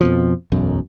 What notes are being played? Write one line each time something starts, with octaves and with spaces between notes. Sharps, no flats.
F2 B2 F3
E1 B1 F#2